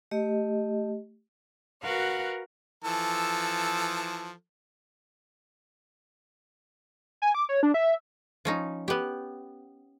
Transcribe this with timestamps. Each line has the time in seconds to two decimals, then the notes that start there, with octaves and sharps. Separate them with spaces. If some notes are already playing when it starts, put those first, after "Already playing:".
0.11 A3 G4 D#5
1.83 F#4 A#4 B4 F5 F#5
2.84 E3 F3 A4
7.22 G#5
7.35 D6
7.49 C#5
7.63 D4
7.74 E5
8.45 F3 C#4 D#4
8.88 B3 G4